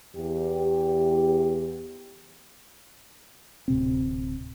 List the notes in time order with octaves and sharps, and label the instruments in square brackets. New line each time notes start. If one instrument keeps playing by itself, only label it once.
[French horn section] E2 G4
[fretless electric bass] D1 C3 C4